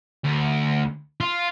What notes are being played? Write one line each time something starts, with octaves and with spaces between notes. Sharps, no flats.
D2
F4